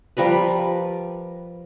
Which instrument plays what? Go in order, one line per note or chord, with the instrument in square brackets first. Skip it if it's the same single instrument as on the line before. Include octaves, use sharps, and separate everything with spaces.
[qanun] F3 G3 A#4 B4